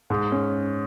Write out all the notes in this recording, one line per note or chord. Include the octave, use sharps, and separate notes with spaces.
G#2
C#4